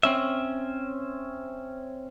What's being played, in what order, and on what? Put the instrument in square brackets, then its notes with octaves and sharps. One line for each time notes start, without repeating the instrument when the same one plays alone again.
[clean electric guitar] C4 C#4 E5